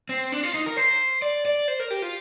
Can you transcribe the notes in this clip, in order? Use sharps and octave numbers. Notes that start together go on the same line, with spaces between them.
C4
D4
F4
D#4
A#4
C5
D5
D5
C5
A#4
G4
F4